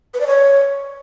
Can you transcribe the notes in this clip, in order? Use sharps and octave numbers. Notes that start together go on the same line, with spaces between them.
B4
D5
C#5